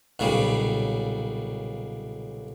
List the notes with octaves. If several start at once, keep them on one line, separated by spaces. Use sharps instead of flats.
B1 A#2 C#3 G3